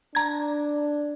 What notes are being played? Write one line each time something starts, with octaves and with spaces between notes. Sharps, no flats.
D4 A#5 G#6